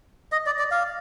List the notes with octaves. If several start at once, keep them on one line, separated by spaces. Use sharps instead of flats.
D#5
D5
D5
F5